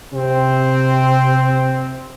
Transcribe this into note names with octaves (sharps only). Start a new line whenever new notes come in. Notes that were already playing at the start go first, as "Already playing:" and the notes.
C3 C4